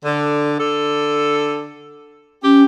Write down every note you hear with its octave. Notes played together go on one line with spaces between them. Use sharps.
D3
D3 A4
C#4 G4